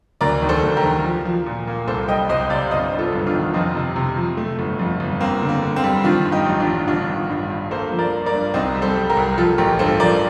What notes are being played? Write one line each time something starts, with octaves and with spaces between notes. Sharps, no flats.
D2 A#4 D5
D#3
A4 C5
D2
G4 A#4
D#3
F3
F3
A#2
A#3
C2 A4 C5
G3 D#5 G5
C2 C5 D#5
C3 D5 F5
G1 C5 D#5
G2
F4 A4
G1
D4 F4
D#3
F2 C4 D#4
C3
C3
F3
A3
G1
F2
G1
A#3 C4
D3
A#3
D3
C4
G3
D#3 D4 F4
G2
D#4 G4
A1
D4 F4
A1
G1 D4 F4
D#3
G2
G2
A#3 A4 C5
F3
A#4 D5
A#3
A#4 D5
G2
C2 C4 D#4
G3
A4 C5
G3
G4 A#4
C2
F3 F4 A4
A1 G4 A#4
G2 A4 C5
F3 A#4 D5